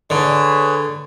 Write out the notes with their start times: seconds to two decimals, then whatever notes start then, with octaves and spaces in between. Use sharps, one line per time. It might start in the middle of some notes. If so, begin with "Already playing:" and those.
0.10 D3 G#4 B4 C#5